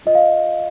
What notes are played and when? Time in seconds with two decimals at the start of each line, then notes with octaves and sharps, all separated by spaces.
0.06 F4 D#5
0.15 F5